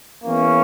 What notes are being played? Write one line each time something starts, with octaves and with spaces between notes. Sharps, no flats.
E2 E3 A#3 C#4